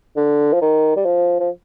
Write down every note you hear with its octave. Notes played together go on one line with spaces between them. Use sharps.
D3
F3
D#3
G3
F3
F3